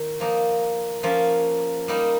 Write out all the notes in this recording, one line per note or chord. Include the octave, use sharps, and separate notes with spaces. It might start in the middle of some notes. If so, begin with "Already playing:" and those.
Already playing: D#3
F3 A#3 D#4
F3 A#3 C#4 F4
G3 A#3 D#4